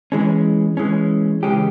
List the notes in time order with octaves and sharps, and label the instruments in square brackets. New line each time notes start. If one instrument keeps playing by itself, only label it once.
[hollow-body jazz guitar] E3 G#3 C#4
E3 G#3 C#4
C#3 E3 G#3 C#4 G4